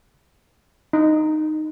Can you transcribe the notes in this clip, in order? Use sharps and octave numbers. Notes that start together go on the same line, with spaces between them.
D#4